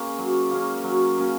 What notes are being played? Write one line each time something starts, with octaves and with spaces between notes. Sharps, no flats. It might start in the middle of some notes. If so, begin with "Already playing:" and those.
Already playing: A#3 C#4 G#4
F#3
A#3 C#4 G#4
F#3
A#3 C#4 G#4